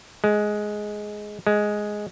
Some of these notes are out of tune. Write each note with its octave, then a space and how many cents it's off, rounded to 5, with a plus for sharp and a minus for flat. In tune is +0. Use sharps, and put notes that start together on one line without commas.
G#3 +10
G#3 +5